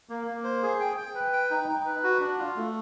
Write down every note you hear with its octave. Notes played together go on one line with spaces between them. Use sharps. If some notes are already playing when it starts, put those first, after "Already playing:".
A#3
A#3
C5
G#4
G5
G5
B4
G5
D#4
D#4
B4
F#4
D4
F4
A3